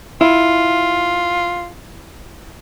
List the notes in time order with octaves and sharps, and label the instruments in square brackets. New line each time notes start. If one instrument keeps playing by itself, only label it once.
[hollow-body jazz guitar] E4 [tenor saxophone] F4